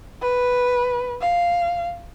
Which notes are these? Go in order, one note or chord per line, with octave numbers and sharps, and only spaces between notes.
B4
F5